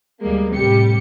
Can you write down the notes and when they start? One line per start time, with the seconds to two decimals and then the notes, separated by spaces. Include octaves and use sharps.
0.21 D2 G3 G#3 A#3
0.55 A2 C3 G3 G4 C#7